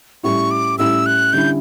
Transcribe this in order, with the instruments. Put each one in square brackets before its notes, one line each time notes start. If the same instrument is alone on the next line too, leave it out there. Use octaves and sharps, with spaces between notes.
[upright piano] A2 G3 C#4 E4 [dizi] C#6
[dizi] D6
[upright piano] A2 G3 C#4 E4 [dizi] E6
[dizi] F#6
[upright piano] D3 G3 C#4 E4 [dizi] G6